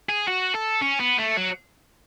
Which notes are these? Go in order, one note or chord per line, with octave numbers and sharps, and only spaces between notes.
G#4
F#4
A4
C#4
B3
A3
F#3